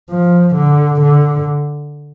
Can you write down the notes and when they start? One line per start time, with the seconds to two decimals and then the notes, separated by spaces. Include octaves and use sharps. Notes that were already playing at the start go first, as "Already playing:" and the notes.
0.10 F3
0.55 D3
1.01 D3